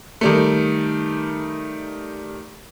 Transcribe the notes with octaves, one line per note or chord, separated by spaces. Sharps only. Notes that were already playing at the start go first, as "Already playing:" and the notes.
D#3 G3 A3